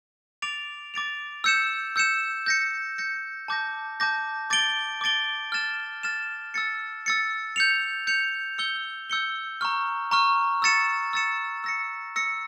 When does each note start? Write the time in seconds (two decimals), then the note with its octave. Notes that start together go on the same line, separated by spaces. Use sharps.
0.42 D6 A6 D7 F7
0.94 D6 A6 D7 F7
1.44 E6 G6 C#7 E7
1.96 E6 G6 C#7 E7
2.46 G6 A#6 C#7
2.98 G6 A#6 C#7
3.48 A5 D6 G6 A#6
4.00 A5 D6 G6 A#6
4.50 D6 A6 D7 G7
5.01 D6 A6 D7 G7
5.52 F6 A6 E7
6.03 F6 A6 E7
6.54 E6 A6 C#7
7.06 E6 A6 C#7
7.56 G6 C#7 F7
8.07 G6 C#7 F7
8.58 E6 G6 C#7 G7
9.10 E6 G6 C#7 G7
9.61 A#5 C#6 F6
10.11 A#5 C#6 F6
10.62 E6 A6 C#7 E7
11.13 E6 A6 C#7 E7
11.64 E6 A#6 C#7
12.16 E6 A#6 C#7